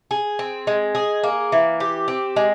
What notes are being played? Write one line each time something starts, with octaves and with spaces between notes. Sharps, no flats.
G#4
C4
G#3
G#4
A#3
E3
G4
C4
G#3